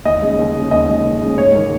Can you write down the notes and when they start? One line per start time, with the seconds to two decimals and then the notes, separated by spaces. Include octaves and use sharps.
0.05 D#2 D#5
0.21 C#3 G#3
0.39 D#2
0.55 C#3 G#3
0.71 D#2 D#5
0.88 C#3 G#3
1.05 D#2
1.21 C#3 G#3
1.38 G#2 C#5
1.55 D#3 A#3